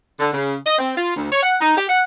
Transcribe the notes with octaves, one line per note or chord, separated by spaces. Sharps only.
D3
C#3
D#5
C4
F4
D2
C#5
F#5
D#4
G4
F#5